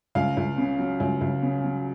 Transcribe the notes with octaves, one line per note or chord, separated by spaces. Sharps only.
C#2 F5
C#2
C#3
F#3
C#2
C#2
C#3
F#3